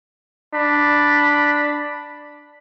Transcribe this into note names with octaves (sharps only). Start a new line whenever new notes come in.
D4 B5